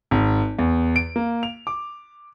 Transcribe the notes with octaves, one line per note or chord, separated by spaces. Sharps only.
G#1
E2
D7
A#3
F7
D6